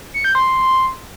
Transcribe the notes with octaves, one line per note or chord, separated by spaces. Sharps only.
C#7
G6
C6